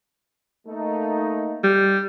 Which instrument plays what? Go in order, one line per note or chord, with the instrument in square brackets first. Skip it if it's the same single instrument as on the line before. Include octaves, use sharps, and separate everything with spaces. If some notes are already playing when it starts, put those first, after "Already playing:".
[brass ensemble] A3 A#3 D#4
[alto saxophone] G3